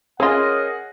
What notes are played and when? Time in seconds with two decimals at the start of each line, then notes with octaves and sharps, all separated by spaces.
0.20 C#4 F4 G#4 A#4 C#5 D#5 F#5